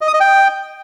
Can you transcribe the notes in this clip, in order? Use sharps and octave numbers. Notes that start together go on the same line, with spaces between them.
D#5
D#6
D#5
G5